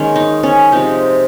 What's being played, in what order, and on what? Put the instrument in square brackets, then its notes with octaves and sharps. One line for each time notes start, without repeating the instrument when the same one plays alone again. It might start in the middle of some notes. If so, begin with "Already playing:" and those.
Already playing: [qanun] D#3 G#3 A#3 C#4
D#4
C#4
C3 F3 G#3 D#4